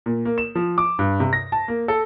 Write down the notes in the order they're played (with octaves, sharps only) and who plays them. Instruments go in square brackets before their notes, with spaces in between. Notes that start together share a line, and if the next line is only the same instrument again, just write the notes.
[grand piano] A#2
A#3
E7
F3
D6
G2
C3
A#6
A5
A#3
A4